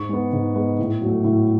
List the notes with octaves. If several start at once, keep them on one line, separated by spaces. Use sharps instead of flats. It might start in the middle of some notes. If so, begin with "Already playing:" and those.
Already playing: G#2 C#6
G#3 B3
G#2
G#3 B3
A2
F#3 A3
A2